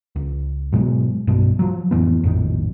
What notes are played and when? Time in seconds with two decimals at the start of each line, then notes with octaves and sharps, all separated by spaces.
0.16 C#2
0.72 G#2 B2 F#3 G#3
1.27 B1 G2 B2
1.59 F3 F#3
1.91 A1 F2 E3 B3
2.24 A#1 F2 A2 D#3